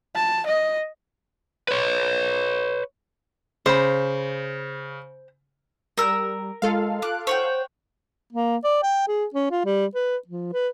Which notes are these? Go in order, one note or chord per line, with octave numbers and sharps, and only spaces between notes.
A5
D#5
B4 C#5
C#3 C5 B5
G3 A#4 E6
G#3 F4 A4 F5
D6 F#6
C5 C#5 F#5 G5
A#3
D5
G5
G#4
C#4
F4
G3
B4
F3
B4